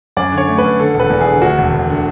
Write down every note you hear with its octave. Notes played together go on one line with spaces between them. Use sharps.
F#2 D5
D3
C#5
A3
B4
F#2
D3 A4
E1
B4
E2
G#4
D3
D2 F#4
E1
E1
D3